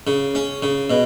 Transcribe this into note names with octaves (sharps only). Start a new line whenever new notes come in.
C#3
C#4
C#3
B2